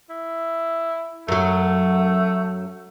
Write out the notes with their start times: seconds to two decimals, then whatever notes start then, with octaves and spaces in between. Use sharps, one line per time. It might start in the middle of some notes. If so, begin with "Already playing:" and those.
0.10 E4
1.28 F#2 F#3 A3